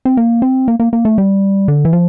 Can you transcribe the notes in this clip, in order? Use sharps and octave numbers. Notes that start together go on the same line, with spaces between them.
C4
A#3
C4
A#3
A#3
A#3
A3
G3
D3
E3
F3